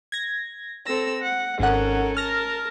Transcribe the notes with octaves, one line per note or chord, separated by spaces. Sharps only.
G#6 A#6
C4 A4 E6 A#6
F#5
G#1 C#4 A4 A#4 F#5
A#4 A5 F6 A#6